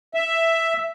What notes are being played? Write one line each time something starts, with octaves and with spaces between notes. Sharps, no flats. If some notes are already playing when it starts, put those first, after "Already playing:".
E5